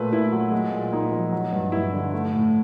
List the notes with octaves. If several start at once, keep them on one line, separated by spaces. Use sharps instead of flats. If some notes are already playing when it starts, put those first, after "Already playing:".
Already playing: A#2 A3 B4
A#2 E4
F#3
G#3
A#2
A#2 D#4
F3
F#3
G2
G2 E4
D3
A3
A2